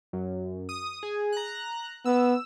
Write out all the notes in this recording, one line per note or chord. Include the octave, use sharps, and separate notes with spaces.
F#2
D#6
G#4
A#5 F#6
B3 E6